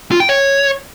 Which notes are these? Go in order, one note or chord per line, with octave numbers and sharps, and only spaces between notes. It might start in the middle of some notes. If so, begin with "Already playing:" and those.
F4
G5
C#5